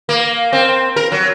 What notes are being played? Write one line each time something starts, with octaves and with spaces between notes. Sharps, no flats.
A#3
C4
A#4
F#3